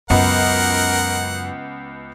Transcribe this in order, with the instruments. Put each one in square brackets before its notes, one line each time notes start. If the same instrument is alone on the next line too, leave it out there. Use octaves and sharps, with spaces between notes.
[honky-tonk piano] C#2 B3 [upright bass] F#2 [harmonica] A#4 F#5